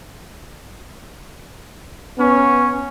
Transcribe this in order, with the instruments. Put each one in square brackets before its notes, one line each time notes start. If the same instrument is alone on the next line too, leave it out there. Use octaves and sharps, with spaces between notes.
[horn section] B3 C#4